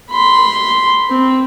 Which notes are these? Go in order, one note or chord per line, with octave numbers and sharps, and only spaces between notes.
B5 C6
C4